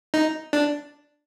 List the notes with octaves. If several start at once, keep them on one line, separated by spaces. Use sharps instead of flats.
D#4
D4